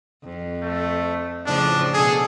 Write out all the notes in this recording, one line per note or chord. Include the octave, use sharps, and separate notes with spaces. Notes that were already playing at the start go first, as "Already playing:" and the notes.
F2
A3
A2 C#3 F3 D4
B2 D4 G#4 A4